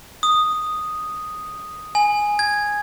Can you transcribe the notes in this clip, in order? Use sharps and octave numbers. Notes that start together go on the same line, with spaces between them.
D#6
G#5
G#6